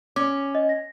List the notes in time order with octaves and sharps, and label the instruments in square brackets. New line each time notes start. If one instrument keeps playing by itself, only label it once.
[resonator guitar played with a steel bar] C#4 [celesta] D6
[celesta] D#5
A#6